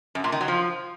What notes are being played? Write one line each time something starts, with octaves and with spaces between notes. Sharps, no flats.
F#2
A#2
D#3
F#3
F3